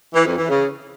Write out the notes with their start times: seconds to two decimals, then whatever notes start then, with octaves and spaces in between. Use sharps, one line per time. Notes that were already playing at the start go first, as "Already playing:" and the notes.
0.13 E3
0.25 F2
0.37 E3
0.48 C#3